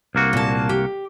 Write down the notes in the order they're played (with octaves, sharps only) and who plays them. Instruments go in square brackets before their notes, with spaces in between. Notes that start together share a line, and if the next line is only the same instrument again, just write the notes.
[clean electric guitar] C2 A#3 F#4
[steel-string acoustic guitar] A#2 A5
G4